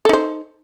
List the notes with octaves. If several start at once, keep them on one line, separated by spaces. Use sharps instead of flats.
D#4 A4 C5